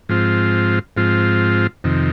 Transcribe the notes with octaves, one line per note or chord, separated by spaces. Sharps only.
G#2 F3 C4 F4
G#2 F3 C4 F4
F2 C3 D#3